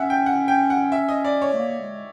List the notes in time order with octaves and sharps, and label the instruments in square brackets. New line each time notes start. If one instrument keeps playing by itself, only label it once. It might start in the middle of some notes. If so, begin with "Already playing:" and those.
Already playing: [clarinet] C#4 [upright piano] E5 F#5
[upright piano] G5
F#5
G5
F#5
E5
D#5
D5
C#5
[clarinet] A3
A#3
G#3